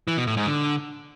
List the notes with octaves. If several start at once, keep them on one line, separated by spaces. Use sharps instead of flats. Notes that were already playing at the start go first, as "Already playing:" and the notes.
E3
B2
A2
G#2
D3